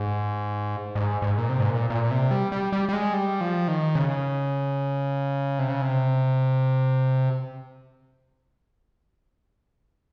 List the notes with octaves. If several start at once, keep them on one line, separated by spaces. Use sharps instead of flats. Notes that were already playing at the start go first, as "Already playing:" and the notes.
Already playing: G#2
G#2
G#2
A#2
C3
G#2
A#2
A#2
C3
G3
G3
G3
G3
G#3
G3
F3
D#3
C#3
C3
C#3
C3